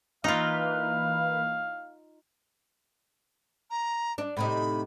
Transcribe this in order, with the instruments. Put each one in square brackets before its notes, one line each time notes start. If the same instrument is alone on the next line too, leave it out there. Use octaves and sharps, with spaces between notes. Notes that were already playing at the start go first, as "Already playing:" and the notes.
[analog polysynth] E3 A#3 B4 [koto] D#4 F4 [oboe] F5
[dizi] A#5
[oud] D4
[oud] A2 C3 D#4 [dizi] B5